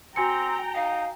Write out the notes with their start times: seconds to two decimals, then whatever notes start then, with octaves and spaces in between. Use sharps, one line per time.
0.16 C4 F#4 G5 G#5 A#5 C#7
0.75 D#4 F5